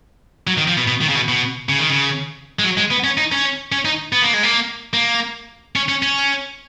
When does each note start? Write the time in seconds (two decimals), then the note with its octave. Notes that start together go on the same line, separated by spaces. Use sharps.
0.47 F#3
0.58 D#3
0.68 F3
0.77 B2
0.88 B2
1.01 D#3
1.09 C#3
1.15 B2
1.29 B2
1.69 C#3
1.79 D#3
1.90 C#3
2.59 G#3
2.64 F#3
2.77 G#3
2.91 B3
3.04 C#4
3.17 D#4
3.32 C#4
3.72 C#4
3.85 D#4
4.13 B3
4.22 A#3
4.34 G#3
4.43 A#3
4.93 A#3
5.76 C#4
5.89 C#4
6.02 C#4